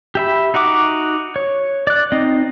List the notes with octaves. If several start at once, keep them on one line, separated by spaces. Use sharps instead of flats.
G4 E5 B5
D#4 F#4 F#5 D6
C#5
D5 F#6
C4 D#4 D#5